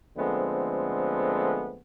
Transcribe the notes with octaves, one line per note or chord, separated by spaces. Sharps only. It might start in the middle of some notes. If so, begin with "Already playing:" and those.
D3 F3 G#3 A3 B3 C4